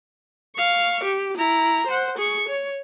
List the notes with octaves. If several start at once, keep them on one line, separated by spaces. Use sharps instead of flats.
F5 C#6
G4
E4 A#5
C5 F#5
G#4 C#6
C#5